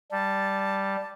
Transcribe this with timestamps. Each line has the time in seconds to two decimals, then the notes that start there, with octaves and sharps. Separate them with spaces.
0.11 G3 A5